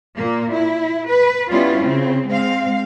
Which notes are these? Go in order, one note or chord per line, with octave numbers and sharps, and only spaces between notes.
A#2 A#3
E4
B4
G3 B3 C#4 E4 F4
C#3 C4
G#3 C4 F5